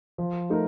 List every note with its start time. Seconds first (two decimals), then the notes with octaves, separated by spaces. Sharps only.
0.18 F3
0.50 A3 D#4 A#4